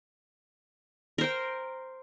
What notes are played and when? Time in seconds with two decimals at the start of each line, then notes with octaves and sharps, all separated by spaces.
1.18 A#4
1.21 C5
1.23 G5